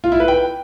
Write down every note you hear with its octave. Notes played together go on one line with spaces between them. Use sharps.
F4
E4
B4
G5